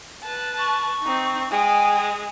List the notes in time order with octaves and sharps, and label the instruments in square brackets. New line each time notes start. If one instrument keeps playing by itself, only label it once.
[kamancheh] B4 A5
[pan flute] C#6
[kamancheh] C4 D#4
[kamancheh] G#3 D#6 [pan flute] G5